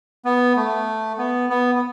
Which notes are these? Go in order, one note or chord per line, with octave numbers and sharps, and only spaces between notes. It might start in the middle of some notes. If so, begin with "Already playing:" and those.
B3
A3
B3
B3
B3